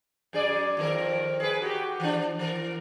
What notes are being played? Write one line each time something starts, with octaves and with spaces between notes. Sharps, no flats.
F#2 G#4 D5
F2 D#3 A#4
G#4 B4
F#4 G4
E3 D4
E3 A#4